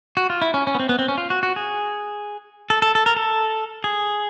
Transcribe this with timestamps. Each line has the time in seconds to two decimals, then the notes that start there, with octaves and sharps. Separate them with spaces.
0.17 F#4
0.30 F4
0.42 E4
0.54 C#4
0.67 C#4
0.75 B3
0.80 C4
0.89 B3
0.99 C4
1.08 C#4
1.18 F4
1.30 F#4
1.43 F#4
1.56 G#4
2.70 A4
2.82 A4
2.95 A4
3.06 A#4
3.16 A4
3.84 G#4